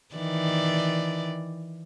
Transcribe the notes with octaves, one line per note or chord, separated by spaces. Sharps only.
D#3 E3 D5